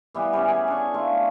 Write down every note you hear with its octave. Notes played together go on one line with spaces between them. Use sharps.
E3 G3 B3
G3 C#4
G#4 B4
D4 C#6
A3 F4